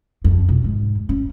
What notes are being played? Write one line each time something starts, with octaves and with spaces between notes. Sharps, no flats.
F2
B1
G#2
C#4